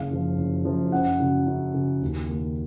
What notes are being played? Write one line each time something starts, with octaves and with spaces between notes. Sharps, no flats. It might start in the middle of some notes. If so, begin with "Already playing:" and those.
Already playing: F#1 F5
F#2 F3
F#1
F#2 F3
F#2 F#5
C#3 F#3
F#2
C#3 F#3
D#2
D#3 A#3